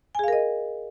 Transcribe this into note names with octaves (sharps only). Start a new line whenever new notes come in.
G#4 A#4 D#5 F5 G#5